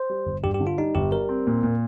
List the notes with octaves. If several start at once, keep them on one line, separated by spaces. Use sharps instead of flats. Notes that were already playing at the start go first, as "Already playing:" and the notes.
Already playing: C5
G3
G1
G2 G4
G4
D3
F4
G3 D#4
G1 G4
G3 A#4
C4
A#2
A#2